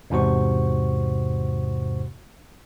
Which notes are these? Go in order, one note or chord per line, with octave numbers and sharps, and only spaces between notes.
E2 G#2 C3 F#4 C5 C#6